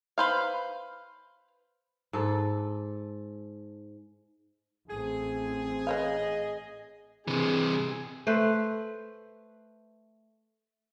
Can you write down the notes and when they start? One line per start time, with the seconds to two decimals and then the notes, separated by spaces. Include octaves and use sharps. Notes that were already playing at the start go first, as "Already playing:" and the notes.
0.18 B4 C5 F5
2.13 G#2 A4
4.89 A1 A3 C4 G#4
5.87 B4 C#5 D#5 F5
7.27 C3 E3 G#4
8.27 A3 B4 C5